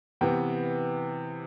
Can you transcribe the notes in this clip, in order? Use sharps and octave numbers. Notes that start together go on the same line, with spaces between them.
C3 E3 B3 G5